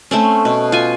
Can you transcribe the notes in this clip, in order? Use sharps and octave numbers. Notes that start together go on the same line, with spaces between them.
A3 C4 C#4
B2
F4 G#5